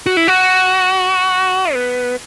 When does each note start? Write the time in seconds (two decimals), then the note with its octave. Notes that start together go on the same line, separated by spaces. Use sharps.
0.06 F#4
0.17 E4
0.28 F#4
1.73 B3